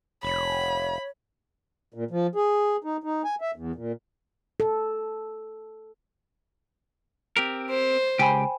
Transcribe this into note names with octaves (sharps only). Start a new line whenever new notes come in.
F1 C#5 B5
A#2
F3
G#4
D#4
D#4
G#5
E5
E2
A#2
A4
C4 G4 A#4
C5
C#2 G4 G5 G#5 B5